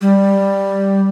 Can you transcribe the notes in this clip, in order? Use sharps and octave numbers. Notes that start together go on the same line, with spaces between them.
G3